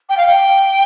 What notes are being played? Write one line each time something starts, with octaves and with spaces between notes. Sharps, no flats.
G5
F5
G5